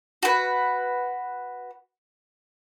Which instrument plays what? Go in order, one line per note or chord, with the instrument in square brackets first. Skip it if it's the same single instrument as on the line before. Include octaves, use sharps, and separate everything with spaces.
[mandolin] F#4 B4